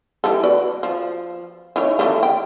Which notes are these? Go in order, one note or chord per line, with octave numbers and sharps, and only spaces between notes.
E3 G3 A4
F#4 B4 D5
F3
E3 D#4 C#5
E3 F#3 A3
G5